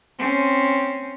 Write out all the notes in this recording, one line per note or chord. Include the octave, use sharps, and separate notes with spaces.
C4 C#4